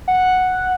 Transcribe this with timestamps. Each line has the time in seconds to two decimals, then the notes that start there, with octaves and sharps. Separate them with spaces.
0.08 F#5